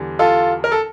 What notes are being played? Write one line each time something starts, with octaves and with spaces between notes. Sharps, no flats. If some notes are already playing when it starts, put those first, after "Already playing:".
Already playing: E2 D3 G3
F4 A4
A#4
A4